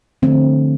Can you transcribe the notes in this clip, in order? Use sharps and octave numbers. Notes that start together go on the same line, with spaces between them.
D3 F3 A3 C4